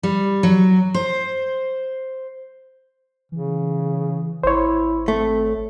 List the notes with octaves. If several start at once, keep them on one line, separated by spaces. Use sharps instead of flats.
G3
F#3
C5
C#3 E3
G#1 E4 C5 C#5
A3 C4